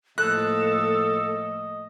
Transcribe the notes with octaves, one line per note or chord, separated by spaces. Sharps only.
A2 F3 A#3 A4 D#5 F#6